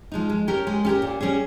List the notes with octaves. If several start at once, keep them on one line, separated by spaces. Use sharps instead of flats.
F3 G#3 D#4
G#3
C#4 G4 A#4
G#3
C#4 G4 A#4
A#2
G3 C#4 G#4